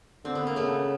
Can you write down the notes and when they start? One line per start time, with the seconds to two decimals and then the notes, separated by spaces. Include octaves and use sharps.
0.24 D3 C4
0.35 B3
0.47 A#3
0.55 C#3 A3 B3